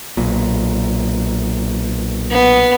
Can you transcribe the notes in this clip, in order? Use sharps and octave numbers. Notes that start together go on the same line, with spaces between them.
B1 A#2
B3